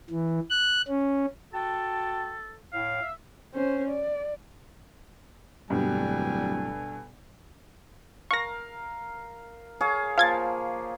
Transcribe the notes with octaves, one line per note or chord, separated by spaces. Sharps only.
E3
F#6
C#4
F#4 A4 G5 A5
A2 F5
E5
C#4 C5
D5
D1 G2 B2 G3 A4 G#5
A#4 F5 C#6 A#6
G#4 C#5 F5
F3 A#3 F5 G#6 A6